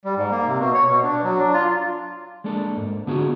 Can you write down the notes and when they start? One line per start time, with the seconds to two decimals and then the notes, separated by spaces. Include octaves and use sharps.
0.05 G3
0.16 G#2
0.31 A#3
0.46 C3
0.59 B2
0.74 C#5
0.89 B2
1.04 D4
1.24 F#3
1.39 D4
1.54 F4
2.44 G#3 A#3 D4 A4
2.77 G#2
3.07 D3 B3 D4 F4 F#4 G#4